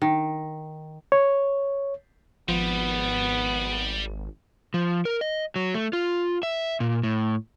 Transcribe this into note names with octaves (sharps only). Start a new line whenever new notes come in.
D#3
C#5
G#1 F3 G3 B3
F3
A#4
D#5
F#3
A3
F4
E5
A#2
A2